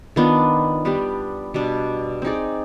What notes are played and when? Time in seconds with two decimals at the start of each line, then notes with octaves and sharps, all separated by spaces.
0.16 D#3 B3 D4 F4
0.85 G3 B3 D4 G4
1.54 B2 G3 D4
2.22 C4 D#4 G#4 D5